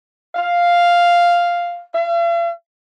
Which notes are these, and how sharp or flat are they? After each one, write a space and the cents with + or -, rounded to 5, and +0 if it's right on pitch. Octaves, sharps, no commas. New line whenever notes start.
F5 +0
F5 -45